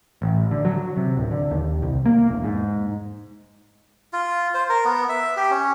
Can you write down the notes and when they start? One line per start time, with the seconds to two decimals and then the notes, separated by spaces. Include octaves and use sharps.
0.22 A1
0.51 D3
0.65 F#3
0.97 C3
1.17 D1
1.31 D3
1.51 D#2
1.82 C2
2.06 A#3
2.28 E1
2.44 G#2
4.13 F4
4.54 C5
4.69 A#4
4.85 B3
5.09 E5
5.37 G4
5.51 C#4